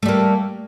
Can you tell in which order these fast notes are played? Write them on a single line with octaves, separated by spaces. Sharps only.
A3 G3 A#3